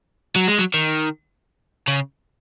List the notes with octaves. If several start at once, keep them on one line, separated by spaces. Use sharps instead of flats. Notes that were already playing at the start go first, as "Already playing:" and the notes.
F#3
G#3
F#3
D#3
C#3